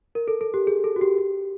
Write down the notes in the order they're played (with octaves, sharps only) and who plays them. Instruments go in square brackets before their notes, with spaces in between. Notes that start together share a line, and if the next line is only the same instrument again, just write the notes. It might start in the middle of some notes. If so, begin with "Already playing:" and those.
[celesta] A#4
A4
A4
G4
G#4
A4
F#4
G4
G4